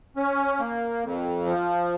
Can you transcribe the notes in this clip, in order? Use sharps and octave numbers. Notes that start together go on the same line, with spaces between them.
C#4
A#3
F2
F3